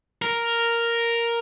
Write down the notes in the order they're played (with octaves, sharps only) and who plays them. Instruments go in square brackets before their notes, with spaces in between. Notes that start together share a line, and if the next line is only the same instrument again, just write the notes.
[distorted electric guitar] A#4